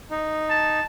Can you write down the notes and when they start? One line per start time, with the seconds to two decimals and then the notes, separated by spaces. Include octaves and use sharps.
0.11 D#4
0.50 A5